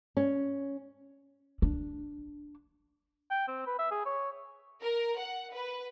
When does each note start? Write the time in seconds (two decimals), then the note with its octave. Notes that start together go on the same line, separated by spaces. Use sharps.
0.17 C#4
1.62 D4
3.31 G5
3.48 C4
3.67 B4
3.79 E5
3.91 G#4
4.06 C#5
4.83 A#4
5.19 F#5
5.54 B4